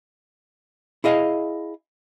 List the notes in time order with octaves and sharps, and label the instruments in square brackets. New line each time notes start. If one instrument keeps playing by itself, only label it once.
[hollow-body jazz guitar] E4 G#4 D#5 F5